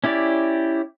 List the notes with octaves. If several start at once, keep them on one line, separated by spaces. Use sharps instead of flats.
C#4 E4 G4 D5